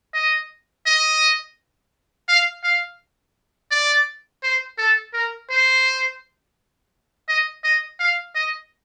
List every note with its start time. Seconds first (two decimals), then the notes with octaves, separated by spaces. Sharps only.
0.14 D#5
0.86 D#5
2.28 F5
2.63 F5
3.71 D5
4.43 C5
4.78 A4
5.13 A#4
5.50 C5
7.28 D#5
7.64 D#5
8.00 F5
8.35 D#5